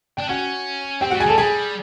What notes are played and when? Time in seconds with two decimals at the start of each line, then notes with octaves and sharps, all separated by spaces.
0.17 D4 G5
0.29 C#4 F#4 F#5
1.01 C4 G4 G5
1.10 F#4 F#5
1.14 G3
1.20 G#4 G#5
1.26 G3 A4 A5
1.38 G3 G#4 G#5